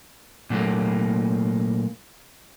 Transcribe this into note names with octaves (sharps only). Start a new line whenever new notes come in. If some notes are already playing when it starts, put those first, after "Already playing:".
A#2 F#3 A3 A#3